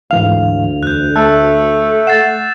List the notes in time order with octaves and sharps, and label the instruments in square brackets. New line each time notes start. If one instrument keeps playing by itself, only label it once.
[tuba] D2 [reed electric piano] G#2 E3 F5 [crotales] F7
[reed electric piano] E2 [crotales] F#6 G6
[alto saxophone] A3 [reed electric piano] A5 [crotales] E6 F#6
[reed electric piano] F#5 [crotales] A6 C7 E7